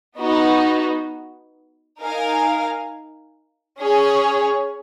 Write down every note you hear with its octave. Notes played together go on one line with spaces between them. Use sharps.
B3 D#4 F#4
D#4 A#4 F5 G#5
C#4 G#4 C#5